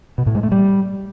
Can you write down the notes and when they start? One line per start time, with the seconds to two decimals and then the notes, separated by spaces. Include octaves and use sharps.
0.18 B2
0.26 A2
0.35 G#3
0.43 A3
0.52 G3